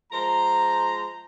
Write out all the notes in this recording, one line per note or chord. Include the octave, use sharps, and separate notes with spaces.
F3 G#3 C5 A#5